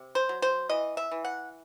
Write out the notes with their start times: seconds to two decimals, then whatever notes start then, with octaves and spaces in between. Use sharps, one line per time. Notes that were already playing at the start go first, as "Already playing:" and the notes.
Already playing: C3
0.15 C5
0.29 F#3
0.42 C5
0.69 E3 D#5
0.97 E5
1.11 E3
1.25 F#5